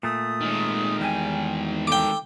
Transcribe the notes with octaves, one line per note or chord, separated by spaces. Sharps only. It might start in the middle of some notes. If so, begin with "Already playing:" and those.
A#2 A3 D#6
D#3 G#3
E2 G3 G5 G#5
A4 G5 D6